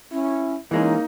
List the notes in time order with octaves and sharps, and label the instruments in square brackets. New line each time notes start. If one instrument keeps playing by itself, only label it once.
[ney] C#4 [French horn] E4
[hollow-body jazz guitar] E3 G#3 C#4 [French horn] A#3 [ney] D#4